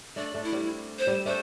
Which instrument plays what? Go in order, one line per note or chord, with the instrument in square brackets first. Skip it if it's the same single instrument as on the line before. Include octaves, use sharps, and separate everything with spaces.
[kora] A3 D4 [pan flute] D5
[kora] A3 D4
[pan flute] E4
[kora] G3 C4
[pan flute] C5
[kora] G3 C4
[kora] A3 D4 [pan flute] C5